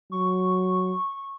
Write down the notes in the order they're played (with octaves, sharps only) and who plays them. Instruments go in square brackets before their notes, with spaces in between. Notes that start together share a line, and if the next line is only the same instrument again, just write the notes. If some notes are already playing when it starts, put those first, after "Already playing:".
[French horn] F#3 [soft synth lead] C#6